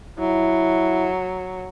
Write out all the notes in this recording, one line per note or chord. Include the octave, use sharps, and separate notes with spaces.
F#3 E4